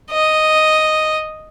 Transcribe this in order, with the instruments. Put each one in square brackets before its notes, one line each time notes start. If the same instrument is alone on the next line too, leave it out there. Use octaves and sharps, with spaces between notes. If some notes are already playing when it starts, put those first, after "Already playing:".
[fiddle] D#5